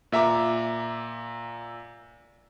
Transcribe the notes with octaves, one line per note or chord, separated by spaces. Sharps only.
A#2 E5 A#5 D6